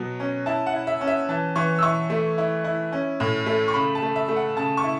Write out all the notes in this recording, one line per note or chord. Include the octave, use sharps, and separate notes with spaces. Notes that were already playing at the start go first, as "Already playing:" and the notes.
Already playing: B2 F#3
C#4
E4 A5
F#5
E4
E5
C#4
E5
E3 A5
E3 C#6
E6
E4 C#6
A3
E4
E4
C#4
A2
A3
C#6
C#3 B5
A5
A3
E5
A3
F#5
C#3 A5
C#6
E4